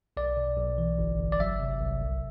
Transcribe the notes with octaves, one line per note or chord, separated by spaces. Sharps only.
B1 D5
B2
B1
E3
G1
G1
D5
F#3 E5
C3
C2
B1